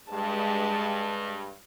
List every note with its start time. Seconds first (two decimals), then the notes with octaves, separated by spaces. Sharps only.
0.11 G2 G#3 A5